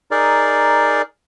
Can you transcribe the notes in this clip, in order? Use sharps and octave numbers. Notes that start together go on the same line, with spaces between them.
D#4 G#4 A#4 D5